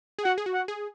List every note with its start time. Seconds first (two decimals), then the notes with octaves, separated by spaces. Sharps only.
0.19 G#4
0.24 F#4 F#5
0.38 G#4
0.46 F#4
0.54 F#5
0.68 G#4